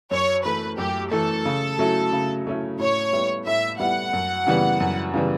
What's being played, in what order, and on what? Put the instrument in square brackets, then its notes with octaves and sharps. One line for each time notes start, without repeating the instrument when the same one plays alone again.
[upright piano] F#2 [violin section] C#5
[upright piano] E3 A3 [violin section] B4
[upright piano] F#2 [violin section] G4
[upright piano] E3 A3 [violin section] A4
[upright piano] C#3
F#3 A3 C#4 E4
C#3
F#3 A3 C#4 E4
[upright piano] A2 [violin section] C#5
[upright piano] G3 B3 E4
[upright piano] A2 [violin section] E5
[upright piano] G3 B3 E4 [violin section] F#5
[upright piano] F#2
C#3 E3 G3 B3
F#2
C#3 E3 G3 B3